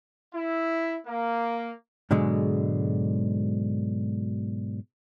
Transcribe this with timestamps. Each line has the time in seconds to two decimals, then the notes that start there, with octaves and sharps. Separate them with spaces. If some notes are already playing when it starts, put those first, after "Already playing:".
0.33 E4
1.06 A#3
2.11 G#2 B2 D3 F#3 G#3